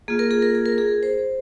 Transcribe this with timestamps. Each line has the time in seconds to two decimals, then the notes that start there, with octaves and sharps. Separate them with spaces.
0.08 A#3 F4 G#4
0.19 A#4
0.31 G#4
0.42 A#4
0.55 G#4
0.66 A#4
0.78 G#4
1.03 C5